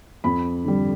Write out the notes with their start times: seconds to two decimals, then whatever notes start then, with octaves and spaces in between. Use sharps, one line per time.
0.24 F2 B5
0.65 D3 G3